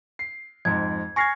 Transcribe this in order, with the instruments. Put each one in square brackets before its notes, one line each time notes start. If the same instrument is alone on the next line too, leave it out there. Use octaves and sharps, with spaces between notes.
[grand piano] C7
[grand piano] F2 G#2 [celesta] G#6
[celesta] G#5 A#6 C7 [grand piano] C#6 F6 G#6